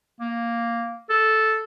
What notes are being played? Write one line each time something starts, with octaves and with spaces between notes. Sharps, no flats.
A#3
A4